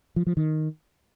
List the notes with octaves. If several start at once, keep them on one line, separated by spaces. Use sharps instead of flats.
F3
F3
D#3